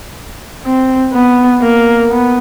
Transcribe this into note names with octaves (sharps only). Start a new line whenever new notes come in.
C4
B3
A#3
B3